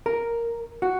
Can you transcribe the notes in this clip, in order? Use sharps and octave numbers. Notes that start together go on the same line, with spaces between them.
A#4
F#4